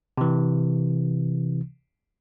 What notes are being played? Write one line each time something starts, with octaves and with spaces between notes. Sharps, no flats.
C3 E3